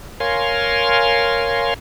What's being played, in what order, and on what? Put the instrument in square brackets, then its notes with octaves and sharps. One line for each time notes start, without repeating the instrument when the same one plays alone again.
[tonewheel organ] A#4 C#5 F5 G#5 C6